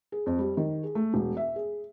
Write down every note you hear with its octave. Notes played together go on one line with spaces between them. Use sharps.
G#4
F2
G3
D#3
G#4
A3
E1
E5
G#4